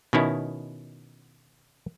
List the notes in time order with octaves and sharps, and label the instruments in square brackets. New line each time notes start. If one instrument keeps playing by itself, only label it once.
[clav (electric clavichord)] B2 D#3 C#4 E4